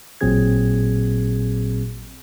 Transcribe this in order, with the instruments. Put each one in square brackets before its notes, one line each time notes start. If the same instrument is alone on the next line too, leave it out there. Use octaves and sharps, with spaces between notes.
[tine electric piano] A1 A#2 F#3 C4 G#4 G#6